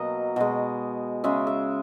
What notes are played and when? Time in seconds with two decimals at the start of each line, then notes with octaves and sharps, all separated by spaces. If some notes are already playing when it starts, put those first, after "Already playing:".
Already playing: B2 F#3 A#3 D#5
0.36 B2 G#3
1.24 C#3 G#3 E5
1.47 E5